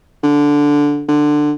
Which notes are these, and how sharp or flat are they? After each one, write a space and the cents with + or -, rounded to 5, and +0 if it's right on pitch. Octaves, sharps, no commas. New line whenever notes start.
D3 -10
D3 +15